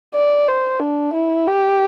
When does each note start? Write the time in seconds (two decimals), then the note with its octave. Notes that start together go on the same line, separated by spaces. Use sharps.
0.14 D5
0.48 C5
0.80 D4
1.13 E4
1.47 G4